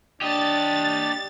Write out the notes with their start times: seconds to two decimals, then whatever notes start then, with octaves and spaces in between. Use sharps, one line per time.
0.21 D4 G4 D#5 A6